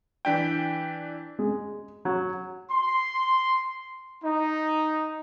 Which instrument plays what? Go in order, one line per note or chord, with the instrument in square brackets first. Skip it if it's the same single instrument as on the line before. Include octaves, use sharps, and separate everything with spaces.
[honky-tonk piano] E3 D4 G6 [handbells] G5 B6
[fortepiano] G#3
F#3
[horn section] C6
D#4